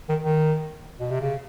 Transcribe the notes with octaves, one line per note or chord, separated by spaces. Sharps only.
D#3
D#3
B2
C3
C#3